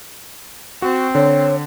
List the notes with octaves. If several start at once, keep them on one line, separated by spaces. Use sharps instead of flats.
C4 F#4
D3 C#5